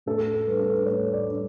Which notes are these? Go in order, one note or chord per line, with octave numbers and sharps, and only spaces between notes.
A2 A4
G3 D4 B4
A4
B4
A2 C#5
D5
G3 D4